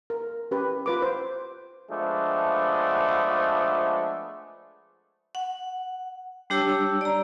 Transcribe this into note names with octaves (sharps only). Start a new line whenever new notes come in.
A#4
C#4 G4 B4
F4 B4 D6
C5
F3 G#3 A3 B3 D4
F#5
G3 D4 G4 C#5 A5 E6
D5 A#5